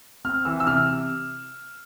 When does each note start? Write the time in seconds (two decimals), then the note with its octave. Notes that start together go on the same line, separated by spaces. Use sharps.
0.25 C4 F6
0.45 E3 E6
0.60 E6
0.66 C3 F6